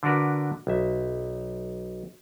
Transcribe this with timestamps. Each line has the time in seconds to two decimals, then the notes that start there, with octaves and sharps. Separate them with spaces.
0.03 D3 D4 F#4 A#4 B4
0.67 B1 E5